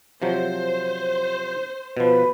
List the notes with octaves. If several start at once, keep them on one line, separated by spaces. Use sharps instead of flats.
C3 F3 F#3 C5
B2 F3 B4